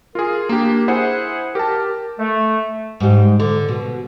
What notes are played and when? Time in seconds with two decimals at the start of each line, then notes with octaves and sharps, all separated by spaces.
0.15 F4 G#4 A#4
0.49 A#3 D4 G4
0.88 E4 G#4 C5 F#5
1.55 G4 A#4 A5
2.19 A3
3.00 G#2 G3
3.40 D3
3.69 B2